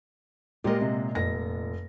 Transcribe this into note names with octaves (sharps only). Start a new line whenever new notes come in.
A#2 G#3 G4 A#4 D#5
C3
F1 A#6